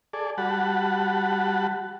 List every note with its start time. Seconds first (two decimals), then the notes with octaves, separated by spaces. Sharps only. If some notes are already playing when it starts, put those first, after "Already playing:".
0.13 G#4 A4 D5
0.38 G3 F#4 F#5 A5 B5